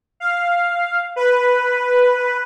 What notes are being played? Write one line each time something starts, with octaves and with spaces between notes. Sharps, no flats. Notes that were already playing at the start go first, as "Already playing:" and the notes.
F5
B4